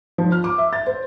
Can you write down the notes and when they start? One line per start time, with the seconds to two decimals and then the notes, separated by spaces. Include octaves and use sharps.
0.18 F3
0.32 F6
0.44 D6
0.58 E5
0.73 A6
0.87 C5